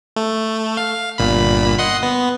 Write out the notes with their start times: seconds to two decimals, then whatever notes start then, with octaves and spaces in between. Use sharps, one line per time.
0.16 A3
0.77 F5
1.18 G1 A#2 B5
1.78 D#5 F#5 C6
2.03 B3